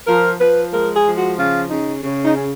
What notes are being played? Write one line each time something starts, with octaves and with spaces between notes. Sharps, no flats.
F3 A#4
F3 B4
G#3 A#4
G#4
F3
F#4
C#3 F4
C#3 D#4
C#3
D#4
C#4